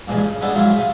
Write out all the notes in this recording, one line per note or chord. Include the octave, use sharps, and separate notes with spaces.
G2 A#2 E3 F3 G#3
C#3
G3 G#3 B3 D4 A4
G#2 F3 F#3 G#3 E4 F4
C3 F4